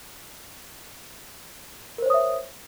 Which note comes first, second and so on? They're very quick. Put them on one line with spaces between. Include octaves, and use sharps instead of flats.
A#4 C5 C#5 D#6 E5